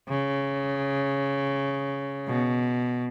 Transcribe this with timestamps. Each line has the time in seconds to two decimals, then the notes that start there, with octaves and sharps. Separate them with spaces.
0.09 C#3
2.27 B2